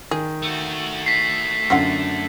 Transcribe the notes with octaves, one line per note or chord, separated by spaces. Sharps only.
D#3 G#4
A3 F#4
B6 C7
F#2 D3 C4 F4 F#5